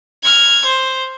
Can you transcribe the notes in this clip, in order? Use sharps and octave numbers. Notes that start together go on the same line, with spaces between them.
F6 G#6
C5